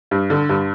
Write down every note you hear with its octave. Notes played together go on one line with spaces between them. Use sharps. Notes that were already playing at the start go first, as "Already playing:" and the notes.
G2
D3
G2